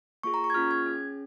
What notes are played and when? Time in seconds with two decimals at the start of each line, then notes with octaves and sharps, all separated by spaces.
0.23 A#3 F4 G#4 C#6
0.34 A#5
0.44 C#6
0.50 G#6
0.54 A#3 C#4 F4 G#4 F6
0.71 G#6
0.86 C#4 G#4